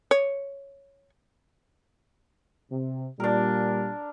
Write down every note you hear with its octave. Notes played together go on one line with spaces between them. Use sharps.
C#5
C3
A#2 G3 D4 A#4